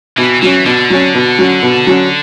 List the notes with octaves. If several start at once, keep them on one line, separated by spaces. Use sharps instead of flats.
B2 E3
E3 F#3 C#4
B2 D3
F#3 C#4
B2
F#3 C#4
B2
F#3 C#4